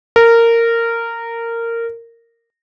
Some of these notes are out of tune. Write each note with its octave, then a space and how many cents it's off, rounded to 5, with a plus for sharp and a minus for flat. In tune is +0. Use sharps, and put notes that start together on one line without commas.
A#4 -15